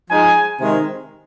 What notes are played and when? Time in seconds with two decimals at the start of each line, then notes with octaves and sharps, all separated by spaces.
0.10 F3 G#3 D#4 G#5
0.60 C3 D#3 G#3 D#4